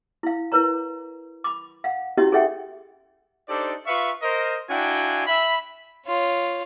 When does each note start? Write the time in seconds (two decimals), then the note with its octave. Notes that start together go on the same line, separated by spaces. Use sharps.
0.23 E4 F5
0.52 E4 A#4 B4 C#5 A#5
1.44 B5 D6
1.84 F5 F#5
2.18 C#4 E4 F#4 G4 C#5 D#5
2.32 G#4 A4 C#5 E5 F#5 G5
3.49 D4 D#4 G4 A4 C5 D5
3.87 F4 B4 E5 F5 C#6
4.22 A#4 C5 D#5
4.69 D4 E4 F#4 F5 G5 G#5
5.27 E5 B5
6.07 F4 C#5